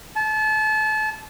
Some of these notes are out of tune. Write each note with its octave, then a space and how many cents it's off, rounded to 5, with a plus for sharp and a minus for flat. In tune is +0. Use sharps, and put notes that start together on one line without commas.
A5 -30